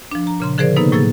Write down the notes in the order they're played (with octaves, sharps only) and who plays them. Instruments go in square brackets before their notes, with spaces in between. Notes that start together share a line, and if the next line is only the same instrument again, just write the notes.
[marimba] F3 D4
A#5
A#2 C#3 C6
D3 F3 G#4 A#4 C5 D5
C3 A#3 B3 D#4 A4 B4
A2 F#3 A#3 G#4 E6 A6